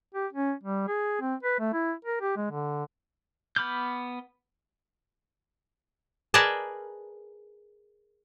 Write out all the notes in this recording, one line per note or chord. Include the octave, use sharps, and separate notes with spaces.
G4
C#4
G3
G#4
C4
B4
A3
E4
A#4
G4
G#3
D3
B3 B5 D6 F6 G6
G#4 A#4 B4 D5 D#5 A5